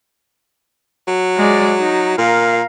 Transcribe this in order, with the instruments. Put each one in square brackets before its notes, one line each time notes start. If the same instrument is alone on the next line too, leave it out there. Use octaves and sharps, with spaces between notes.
[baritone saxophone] F#3
[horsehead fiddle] G#3 D5
D#4
[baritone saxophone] A#2 [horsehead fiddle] A#4 F5